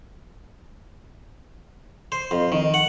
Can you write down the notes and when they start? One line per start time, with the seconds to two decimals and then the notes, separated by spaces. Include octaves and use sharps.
2.12 C5
2.31 F2
2.52 D#3
2.74 F#5